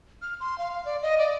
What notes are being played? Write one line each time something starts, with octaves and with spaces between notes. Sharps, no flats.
F6
C6
F5
D5
D#5
D5